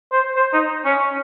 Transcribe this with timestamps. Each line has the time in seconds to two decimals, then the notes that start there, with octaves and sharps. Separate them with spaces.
0.12 C5
0.36 C5
0.53 D#4
0.85 C#4